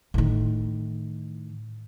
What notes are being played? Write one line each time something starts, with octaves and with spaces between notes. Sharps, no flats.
A2 D#3